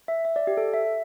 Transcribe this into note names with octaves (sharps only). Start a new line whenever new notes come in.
E5
E5
D5
G4
A4
E5